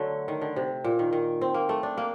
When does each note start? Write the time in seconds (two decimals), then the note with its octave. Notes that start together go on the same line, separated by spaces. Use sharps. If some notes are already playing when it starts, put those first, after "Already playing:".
Already playing: D3 F#3 A3
0.28 D#3
0.41 D3
0.56 C3
0.84 A#2
0.99 D#3
1.13 D#3
1.41 C4
1.54 A#3
1.69 A3
1.83 D4
1.98 A#3